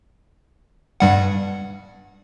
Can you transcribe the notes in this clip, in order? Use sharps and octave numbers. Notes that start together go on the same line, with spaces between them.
G2 G3 F#5